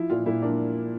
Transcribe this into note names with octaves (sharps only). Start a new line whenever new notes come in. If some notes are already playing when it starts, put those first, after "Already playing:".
Already playing: F3 E4
A#2 F4
A#2 E4
A#3 D4